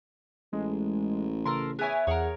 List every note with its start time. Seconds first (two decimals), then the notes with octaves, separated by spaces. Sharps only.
0.53 A1 G#3
1.46 C#3 A4 A#4 C6
1.79 B3 E4 G#4 C#5 G#5
2.07 E2 G#4 A#4 C#5 F#5